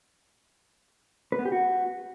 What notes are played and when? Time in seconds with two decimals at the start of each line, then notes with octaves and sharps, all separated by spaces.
1.32 B4
1.39 B3
1.45 G4
1.52 F#4